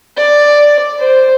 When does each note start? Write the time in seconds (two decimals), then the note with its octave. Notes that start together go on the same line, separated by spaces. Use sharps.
0.17 D5
0.99 C5